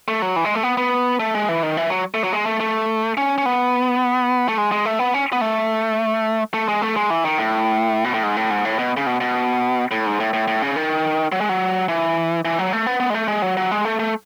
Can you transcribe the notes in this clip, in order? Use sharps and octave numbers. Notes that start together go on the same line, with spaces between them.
A3
F#3
E3
G#3
A3
B3
B3
A3
G#3
E3
D#3
E3
F#3
A3
F#3
G#3
A3
A3
C#4
C#4
B3
A3
G#3
G#3
A3
B3
C#4
B3
A3
A3
G#3
A3
G#3
E3
D#3
A2
B2
A2
G#2
A2
G#2
A2
B2
C#3
B2
B2
A2
G#2
A2
A2
A2
C#3
D#3
F#3
G#3
F#3
E3
E3
F#3
A3
B3
B3
G#3
A3
G#3
F#3
F#3
G#3
A3
A3